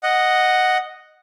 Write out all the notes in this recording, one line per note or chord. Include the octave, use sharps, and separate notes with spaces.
D#5 F#5